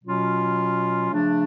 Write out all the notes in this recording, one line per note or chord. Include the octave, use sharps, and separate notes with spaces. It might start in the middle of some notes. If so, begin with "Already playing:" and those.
B2 F#3 C#4 F4
C#3 F3 A3 D4